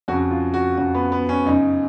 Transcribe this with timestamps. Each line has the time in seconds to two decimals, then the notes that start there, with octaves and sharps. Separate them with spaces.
0.08 F2 F#4
0.12 C#3
0.31 F4
0.54 F#4
0.78 F2 C#3 F#4
0.95 B3
1.12 B3
1.29 C#4
1.46 F#2 C#3 D#4